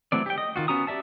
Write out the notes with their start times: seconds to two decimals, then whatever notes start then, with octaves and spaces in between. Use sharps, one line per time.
0.12 E3 F#3 A3 C4 D5
0.26 G4 G5
0.38 D#5
0.56 D#3 F4 F#4
0.68 B3 C#4 F#4 A#5 D#6
0.87 G4 D5 E5 A5